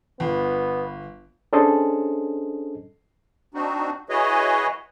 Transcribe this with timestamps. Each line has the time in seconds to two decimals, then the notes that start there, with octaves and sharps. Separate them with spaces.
0.20 G1 B3
1.53 C#4 D4 G#4 A4 C5 D#5
3.54 C4 D4 D#4 F#4
4.09 E4 F#4 G#4 B4 C#5 D#5